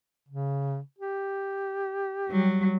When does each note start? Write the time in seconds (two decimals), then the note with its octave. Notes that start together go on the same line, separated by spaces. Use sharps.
0.28 C#3
0.98 G4
2.28 F#3 G3